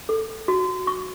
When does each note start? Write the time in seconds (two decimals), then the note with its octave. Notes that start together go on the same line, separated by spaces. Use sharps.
0.09 A4
0.48 F#4
0.87 C#6